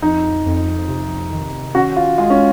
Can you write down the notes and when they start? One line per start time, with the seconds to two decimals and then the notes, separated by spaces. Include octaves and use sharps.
0.02 F2 D#4
0.46 F2
0.88 C3
1.32 D#3
1.75 C#4 F#4
1.96 F4
2.18 G#3 F4
2.30 C#4